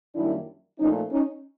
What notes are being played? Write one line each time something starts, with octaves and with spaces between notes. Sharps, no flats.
F#2 D#3 G3 A#3 D4 E4
A#2 F3 A3 C#4 D#4
C#4 D#4